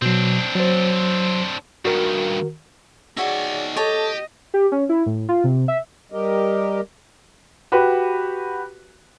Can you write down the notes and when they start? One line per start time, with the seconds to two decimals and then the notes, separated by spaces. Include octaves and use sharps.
0.02 B2 F#3 C4 D4
0.56 F#3 C5
1.85 G2 D#3 F#4 A#4
3.17 D#4 F#4 G#4 C#5 D5 E5
3.76 G4 A4 C#5 D#5 A5
4.54 G4
4.72 C#4
4.89 E4
5.06 A2
5.29 F4
5.44 C3
5.68 E5
6.12 G3 G4 A#4 D#5
7.72 F#4 G4 B4